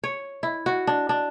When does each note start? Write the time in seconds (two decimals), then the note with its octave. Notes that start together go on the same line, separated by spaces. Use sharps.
0.04 C#5
0.43 E4
0.66 F#4
0.87 D4
1.09 D4